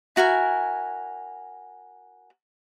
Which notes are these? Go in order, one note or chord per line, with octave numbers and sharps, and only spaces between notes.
E4 F#4 A#4 G#5